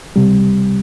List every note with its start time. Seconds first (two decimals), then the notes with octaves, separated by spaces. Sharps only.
0.16 C#2 C3 G3